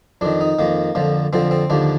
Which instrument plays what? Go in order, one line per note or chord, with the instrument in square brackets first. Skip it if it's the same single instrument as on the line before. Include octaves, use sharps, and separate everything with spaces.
[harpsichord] F2 D#3 D4
D#4
F2 D#3 A#3
F2 D3 F3
F2 D3 F3 C4
C4
D#2 D3 F3 D4